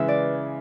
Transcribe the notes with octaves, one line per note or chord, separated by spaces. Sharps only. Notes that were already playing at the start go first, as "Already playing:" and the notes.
Already playing: C#3 E3 G#3 B4 E5
D5